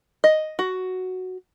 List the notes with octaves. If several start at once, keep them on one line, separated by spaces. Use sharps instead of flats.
D#5
F#4